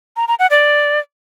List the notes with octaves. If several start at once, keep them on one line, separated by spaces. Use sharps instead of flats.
A#5
A#5
F#5
D5